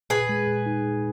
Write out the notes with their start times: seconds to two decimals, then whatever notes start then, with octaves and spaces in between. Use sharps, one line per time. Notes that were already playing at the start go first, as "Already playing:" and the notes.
0.10 A#2 G#4 B4
0.29 G#3
0.47 A#2
0.66 D#4
0.85 A#2